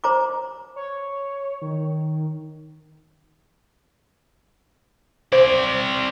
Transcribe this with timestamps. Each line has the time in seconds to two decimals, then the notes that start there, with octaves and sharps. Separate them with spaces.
0.04 C5 A#5 D6
0.76 C#5
1.62 D#3
5.32 C4 C5 D5